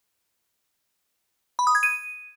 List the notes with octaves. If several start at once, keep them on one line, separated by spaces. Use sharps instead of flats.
B5
D#6
G#6
D#7